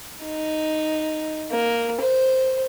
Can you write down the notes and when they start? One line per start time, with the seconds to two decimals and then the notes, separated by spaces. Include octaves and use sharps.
0.24 D#4
1.51 A#3
2.01 C5